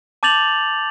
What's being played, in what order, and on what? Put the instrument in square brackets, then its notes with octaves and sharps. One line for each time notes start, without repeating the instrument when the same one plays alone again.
[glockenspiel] A5 D6 G6 A6 F7 F#7